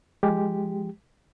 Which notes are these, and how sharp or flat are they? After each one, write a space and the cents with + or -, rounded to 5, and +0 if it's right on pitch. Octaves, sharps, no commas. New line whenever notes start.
F3 -15 G#3 +0 G4 +0